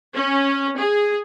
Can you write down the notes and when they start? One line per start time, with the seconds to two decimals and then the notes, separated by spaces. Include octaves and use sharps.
0.14 C#4
0.78 G#4